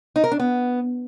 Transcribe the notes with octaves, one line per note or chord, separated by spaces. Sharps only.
D#4
A#4
D4
B3